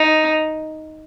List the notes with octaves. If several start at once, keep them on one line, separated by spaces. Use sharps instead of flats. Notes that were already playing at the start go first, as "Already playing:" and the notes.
Already playing: D#4